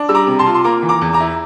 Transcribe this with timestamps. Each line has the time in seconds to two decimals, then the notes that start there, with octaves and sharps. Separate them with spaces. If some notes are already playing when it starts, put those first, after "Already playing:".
Already playing: D4
0.09 G3 E6
0.15 A#5 D6
0.27 C3
0.39 A5 C6
0.46 F4
0.54 C6
0.64 A#3 A#5 D6
0.82 E3
0.89 A#5 D6
1.01 E2
1.13 A#5 D6
1.20 E4